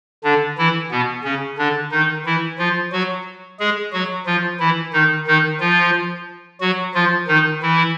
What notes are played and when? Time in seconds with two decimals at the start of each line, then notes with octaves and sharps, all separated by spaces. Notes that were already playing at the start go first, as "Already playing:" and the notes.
0.24 D3 D4
0.58 E3 E4
0.91 B2 B3
1.24 C#3 C#4
1.58 D3 D4
1.91 D#3 D#4
2.25 E3 E4
2.59 F3 F4
2.92 F#3 F#4
3.60 G#3 G#4
3.92 F#3 F#4
4.26 F3 F4
4.59 E3 E4
4.93 D#3 D#4
5.27 D#3 D#4
5.60 F3 F4
6.60 F#3 F#4
6.95 F3 F4
7.28 D#3 D#4
7.62 E3 E4